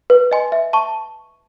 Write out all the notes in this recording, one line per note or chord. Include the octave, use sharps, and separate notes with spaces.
B4
D#5 G#5 C6
E5
A5 C#6